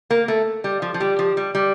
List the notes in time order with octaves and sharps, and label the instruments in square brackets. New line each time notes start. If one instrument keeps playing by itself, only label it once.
[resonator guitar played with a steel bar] A#3 [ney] A#4
[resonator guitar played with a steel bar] A3 [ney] A4
[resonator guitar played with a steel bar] G3
F3
F3
[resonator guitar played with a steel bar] G3 [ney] G4
[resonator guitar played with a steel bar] F3
G3
G3